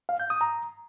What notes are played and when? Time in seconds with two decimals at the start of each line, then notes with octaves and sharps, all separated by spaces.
0.09 F5
0.20 G6
0.30 D#6
0.41 A#5